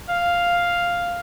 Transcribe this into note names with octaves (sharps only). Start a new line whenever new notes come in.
F5